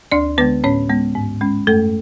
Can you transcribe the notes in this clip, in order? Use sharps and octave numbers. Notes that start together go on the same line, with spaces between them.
D2 D4 D5
D3 G#3 B3 B4
A2 C#4 C#5
G#3 B3
G#2
G#3 C#4
F#2 A3 A4